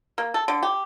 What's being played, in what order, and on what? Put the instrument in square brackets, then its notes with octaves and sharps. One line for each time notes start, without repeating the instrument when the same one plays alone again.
[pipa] A#3
A4
D3
G4